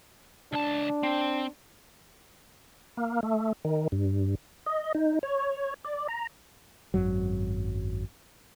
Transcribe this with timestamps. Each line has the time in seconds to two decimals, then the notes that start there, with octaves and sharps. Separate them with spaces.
0.53 C#2 D4 A5
1.03 C4
2.97 A#3
3.23 A3
3.65 D#3
3.92 G2
4.66 D#5
4.95 D#4
5.23 C#5
5.85 D5
6.08 A#5
6.94 G#1 F#2 F#3